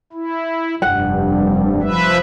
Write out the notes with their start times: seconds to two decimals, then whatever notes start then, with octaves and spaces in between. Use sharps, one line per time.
0.12 E4
0.82 F1 G2 G3 F#5
1.83 F3 B4 E5